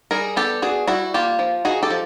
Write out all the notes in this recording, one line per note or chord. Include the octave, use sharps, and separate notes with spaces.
G3 G#4 A#4
B3 G4 A4
D4 F#4 G#4
G3 E4 F#4
A#3 F4 G4
F3
D#4 F#4 G#4
G4 A4
F3